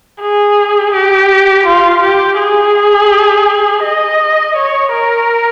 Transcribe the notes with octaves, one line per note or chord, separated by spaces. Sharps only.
G#4
G4
F4
G4
G#4
D#5
C#5
A#4